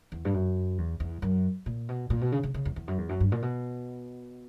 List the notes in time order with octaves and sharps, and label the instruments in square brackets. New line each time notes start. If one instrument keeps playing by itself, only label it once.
[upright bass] E2
G2
F#2
E2
E2
F#2
A#2
B2
A#2
B2
C#3
C#3
C#3
E2
E2
F#2
E2
F#2
G2
A#2
B2